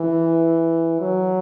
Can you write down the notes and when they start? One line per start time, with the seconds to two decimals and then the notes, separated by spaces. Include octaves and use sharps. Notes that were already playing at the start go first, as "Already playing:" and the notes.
Already playing: E3
1.01 F#3